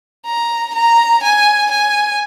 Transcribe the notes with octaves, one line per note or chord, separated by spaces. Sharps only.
A#5
A#5
G#5
G#5